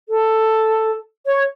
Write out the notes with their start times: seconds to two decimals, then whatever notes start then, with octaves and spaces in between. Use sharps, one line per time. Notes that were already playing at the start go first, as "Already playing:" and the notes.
0.09 A4
1.26 C#5